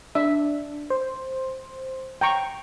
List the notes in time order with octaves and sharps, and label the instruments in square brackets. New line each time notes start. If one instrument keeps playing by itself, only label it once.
[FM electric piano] D4 [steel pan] E5
[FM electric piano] C5
[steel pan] G5 A#5 C#6